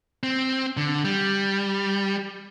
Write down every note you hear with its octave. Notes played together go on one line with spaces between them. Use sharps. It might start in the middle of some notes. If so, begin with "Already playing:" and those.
C4
D3
G3